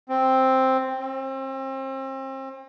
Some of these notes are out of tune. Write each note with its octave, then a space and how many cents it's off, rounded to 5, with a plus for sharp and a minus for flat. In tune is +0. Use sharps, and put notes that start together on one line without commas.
C4 +5
C4 +35